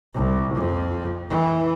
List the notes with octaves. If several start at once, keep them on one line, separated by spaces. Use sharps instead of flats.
C2
F2
E3